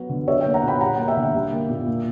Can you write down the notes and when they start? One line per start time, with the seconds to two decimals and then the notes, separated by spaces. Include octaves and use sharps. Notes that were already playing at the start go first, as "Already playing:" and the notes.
Already playing: F#3 B3
0.10 D3
0.27 F#3 C#5 E5
0.41 E5 G5
0.46 A#3
0.54 F#5 A#5
0.63 A#2 G5 B5
0.81 G3 F#5 A#5
0.99 A#3
1.08 E5 G5
1.17 D3
1.34 G3
1.52 A#3
1.70 A#2
1.87 A#3